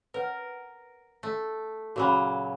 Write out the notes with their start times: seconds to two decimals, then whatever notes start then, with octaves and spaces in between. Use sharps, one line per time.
0.14 A#4 B4 C#5 F#5
1.23 A3
1.96 A#2 C#3 F#3 F#4 A#4 B5